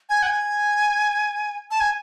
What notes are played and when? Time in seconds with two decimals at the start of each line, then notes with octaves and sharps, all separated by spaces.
0.09 G#5
0.23 F#5
0.27 G#5
1.71 A5
1.80 G#5